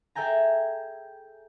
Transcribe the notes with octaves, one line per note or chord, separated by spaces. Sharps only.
G#4 A4 E5 G5 G#5 A#5